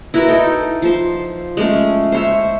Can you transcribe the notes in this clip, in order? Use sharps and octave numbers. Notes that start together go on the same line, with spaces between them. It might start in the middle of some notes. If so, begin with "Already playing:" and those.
E4 F#4 A#4 B4
D#4 A4 G5
F3 C5
G#3 A3 C#4
C5 C#5 E5